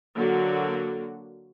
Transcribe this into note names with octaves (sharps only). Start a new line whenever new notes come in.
D3 F#3 A#3 F#4